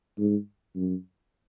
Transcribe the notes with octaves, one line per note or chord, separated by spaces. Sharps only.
G#2
F#2